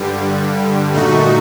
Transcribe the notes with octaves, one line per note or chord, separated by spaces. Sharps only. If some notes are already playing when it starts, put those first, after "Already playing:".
Already playing: G2 D3 G3
A#2 A3 D#4 F#4